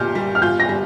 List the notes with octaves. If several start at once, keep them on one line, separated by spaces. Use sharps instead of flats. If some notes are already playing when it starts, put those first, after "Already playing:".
Already playing: A#2 G4 F6 G6
G3
F6
F4 G6
A#6
G3